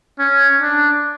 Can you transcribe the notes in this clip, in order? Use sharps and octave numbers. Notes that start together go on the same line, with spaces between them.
C#4
D4